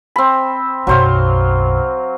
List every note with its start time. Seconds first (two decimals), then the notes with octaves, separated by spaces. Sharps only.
0.16 C4 B5
0.87 B1 F#2 F#3 C5 F5